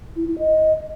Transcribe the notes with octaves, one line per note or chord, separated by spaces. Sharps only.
E4
E4
D#5